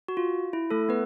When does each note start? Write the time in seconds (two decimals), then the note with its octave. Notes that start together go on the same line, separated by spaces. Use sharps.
0.08 F#4
0.17 F4
0.53 E4
0.71 A3 A4
0.89 B3 B4